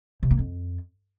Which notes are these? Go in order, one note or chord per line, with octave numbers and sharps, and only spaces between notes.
C3
A#3
F2